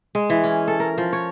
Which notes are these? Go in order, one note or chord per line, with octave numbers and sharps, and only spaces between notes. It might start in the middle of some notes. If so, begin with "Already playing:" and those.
G#3
E3
C#4
A4
A#4
F3
C#5